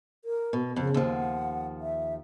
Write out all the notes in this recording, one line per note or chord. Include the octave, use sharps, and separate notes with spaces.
A#4
B2
F2 C#3
D#2 F3
F#5
E5